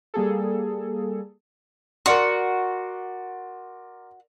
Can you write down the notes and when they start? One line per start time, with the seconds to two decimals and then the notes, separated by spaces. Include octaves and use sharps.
0.14 G3 A#3 G#4 A4
2.06 F#4 A#4 D5 C6